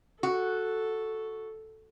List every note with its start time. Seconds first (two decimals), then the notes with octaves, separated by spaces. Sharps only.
0.23 F#4 A4